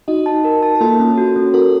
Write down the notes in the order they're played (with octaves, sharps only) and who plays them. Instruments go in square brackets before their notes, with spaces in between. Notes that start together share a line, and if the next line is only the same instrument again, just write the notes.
[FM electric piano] D#4 F#4 [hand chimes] D#5
[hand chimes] A5
A#4
A5
[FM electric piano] A#4
[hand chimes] A#3 [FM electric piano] F4 A4
[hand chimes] C#4
F#4
C#4
[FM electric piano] F#4 A#4 [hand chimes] A4